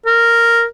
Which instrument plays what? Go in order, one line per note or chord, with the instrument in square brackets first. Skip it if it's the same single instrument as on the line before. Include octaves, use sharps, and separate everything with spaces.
[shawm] A#4